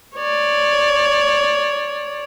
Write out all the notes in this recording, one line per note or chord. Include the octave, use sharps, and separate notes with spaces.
C#5 D5